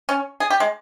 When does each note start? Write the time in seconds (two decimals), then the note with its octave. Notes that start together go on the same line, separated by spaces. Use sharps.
0.09 C#4
0.40 G#4
0.50 G4
0.60 G#3